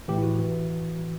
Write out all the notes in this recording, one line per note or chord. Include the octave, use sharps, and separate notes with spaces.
A2 E3 G4
E4
F#4
E3